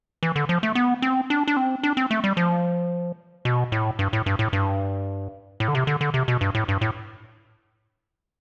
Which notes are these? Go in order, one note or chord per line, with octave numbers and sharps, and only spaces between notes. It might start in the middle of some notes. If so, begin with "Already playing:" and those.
E3
D3
F3
A3
B3
C4
D4
D4
C4
D4
C4
A3
G3
F3
B2
A2
G2
A2
G2
A2
G2
A2
D3
C3
D3
D3
C3
B2
G2
A2
G2
A2